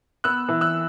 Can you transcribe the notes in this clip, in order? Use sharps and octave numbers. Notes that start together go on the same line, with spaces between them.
B3 E6 F#6
E3
E6 F#6